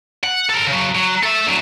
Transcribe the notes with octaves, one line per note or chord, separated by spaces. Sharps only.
F#5
A4 A#4
C#3 F#3
F#3
A4 E5
D2 F#3